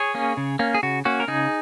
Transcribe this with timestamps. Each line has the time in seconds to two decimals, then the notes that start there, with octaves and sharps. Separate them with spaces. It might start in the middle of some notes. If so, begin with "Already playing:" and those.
Already playing: G#4 C#5
0.14 A#3 C#4
0.37 C#3
0.59 A#3 C#4
0.74 G#4
0.83 C#3 F#4
1.05 A#3 C#4 F#4
1.20 A#4
1.28 C#3 D#4 G#4